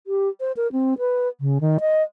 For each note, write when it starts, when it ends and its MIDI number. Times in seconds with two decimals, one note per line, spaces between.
0.07 0.29 67
0.40 0.52 72
0.57 0.71 70
0.72 0.94 60
0.99 1.28 71
1.41 1.58 49
1.61 1.78 51
1.80 2.03 75